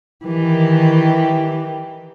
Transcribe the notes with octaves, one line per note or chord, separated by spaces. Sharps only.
D#3 E3 G4